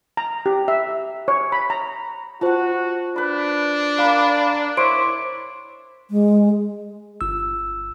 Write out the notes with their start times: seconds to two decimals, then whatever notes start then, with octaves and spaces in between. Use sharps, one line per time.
0.17 A#5
0.46 G4
0.68 E5
1.28 C#5
1.52 B5
1.70 A#5
2.41 F4 F#4 C5 F#5 A5
3.16 D4 B4 B5
3.99 A#4 D5 F5 B5
4.77 E4 C5 C#5 C6 D6 D7
6.11 G#3
7.21 G1 E6